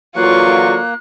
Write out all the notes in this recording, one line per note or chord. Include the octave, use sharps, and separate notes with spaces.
D3 E3 F#3 A#3 F4 C#6 F#6